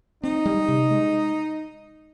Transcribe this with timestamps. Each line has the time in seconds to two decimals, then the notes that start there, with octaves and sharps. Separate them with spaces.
0.23 C4 D#4
0.45 G3
0.68 C3
0.91 G#3